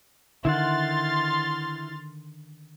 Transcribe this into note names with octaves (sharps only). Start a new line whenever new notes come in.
D3 D#3 E4 F#5 C6 F6 A6